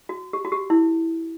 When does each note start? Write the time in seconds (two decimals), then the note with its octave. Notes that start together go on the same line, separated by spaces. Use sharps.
0.09 F#4
0.33 G4
0.45 F#4
0.52 G4
0.70 E4